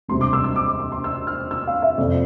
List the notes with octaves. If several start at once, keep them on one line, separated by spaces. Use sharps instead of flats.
E1 D2 C3 G3 C6
D6
E6
E6
D6
D6
C6
C6
E6
F6
E6
F5
E5
F2 C3 F3 D5